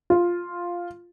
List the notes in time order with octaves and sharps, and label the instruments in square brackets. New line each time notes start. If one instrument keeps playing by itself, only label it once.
[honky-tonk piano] F4